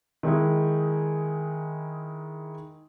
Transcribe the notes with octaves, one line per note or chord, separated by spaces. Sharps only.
D#3 G#3 D#4 E4